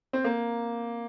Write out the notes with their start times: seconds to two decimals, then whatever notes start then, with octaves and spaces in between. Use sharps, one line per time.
0.13 C4
0.24 A#3